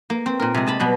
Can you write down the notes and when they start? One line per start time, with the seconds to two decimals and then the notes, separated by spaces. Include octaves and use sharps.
0.10 A#3
0.26 C4
0.40 A#2 A#4
0.54 C3 G#3
0.67 D#5 A5 B5
0.80 B2 F#3 G3